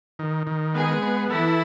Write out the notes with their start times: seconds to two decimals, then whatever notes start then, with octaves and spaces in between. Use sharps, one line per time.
0.19 D#3
0.47 D#3
0.74 G#3 B3 G#4
1.02 B3
1.30 E3 E4 A4